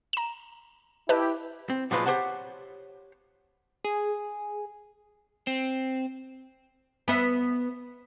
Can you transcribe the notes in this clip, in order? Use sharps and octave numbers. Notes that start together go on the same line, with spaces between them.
A#5 E7
E4 G4 B4 D#5 A5
C4
A#2 F3 F#3 G#3 F4 B4
G4 C5 C#5 F#5 A5
G#4
C4
B3 E5